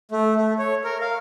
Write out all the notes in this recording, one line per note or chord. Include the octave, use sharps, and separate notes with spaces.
A3
A3
C#5
A#4
F5